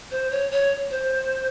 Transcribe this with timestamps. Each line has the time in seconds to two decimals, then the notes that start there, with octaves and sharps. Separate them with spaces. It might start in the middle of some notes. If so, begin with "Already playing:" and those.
0.11 C5
0.31 C#5
0.51 C#5
0.91 C5